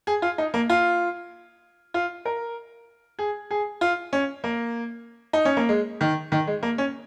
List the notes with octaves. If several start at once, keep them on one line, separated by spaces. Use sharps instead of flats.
G#4
F4
D#4
A#3
F4
F4
A#4
G#4
G#4
F4
C#4
A#3
D#4
C#4
A#3
G#3
D#3
D#3
G#3
A#3
C#4